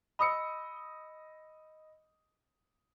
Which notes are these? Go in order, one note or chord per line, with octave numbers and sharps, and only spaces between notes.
D#5 B5 D#6 E6 C#7